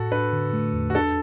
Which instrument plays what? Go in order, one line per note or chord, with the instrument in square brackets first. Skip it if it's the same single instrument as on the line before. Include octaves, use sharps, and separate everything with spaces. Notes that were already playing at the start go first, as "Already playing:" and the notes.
Already playing: [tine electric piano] A2 [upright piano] F#4 A4
[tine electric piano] D4 [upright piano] B4
[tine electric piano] D3
A3
E2
[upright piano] F#4
[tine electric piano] D4 [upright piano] A4